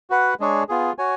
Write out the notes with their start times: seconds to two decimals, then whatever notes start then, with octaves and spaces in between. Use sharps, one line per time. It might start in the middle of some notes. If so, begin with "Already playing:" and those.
0.10 F#4 B4 F#5
0.40 G#3 D4 G#4 C#5
0.69 B3 F4 G#4
0.98 F#4 C#5 G#5